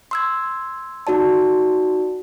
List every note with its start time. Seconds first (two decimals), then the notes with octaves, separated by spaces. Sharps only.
0.11 C6 E6 G#6
1.07 D#4 F#4 D5 A5